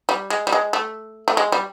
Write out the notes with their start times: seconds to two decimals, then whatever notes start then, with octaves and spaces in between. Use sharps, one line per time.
0.09 G3
0.30 G#3
0.47 G3
0.52 G#3
0.73 A3
1.28 A3
1.37 G#3
1.52 G3